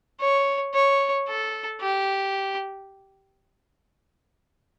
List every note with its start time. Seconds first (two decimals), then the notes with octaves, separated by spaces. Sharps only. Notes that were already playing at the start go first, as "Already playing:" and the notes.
0.21 C#5
0.74 C#5
1.28 A4
1.81 G4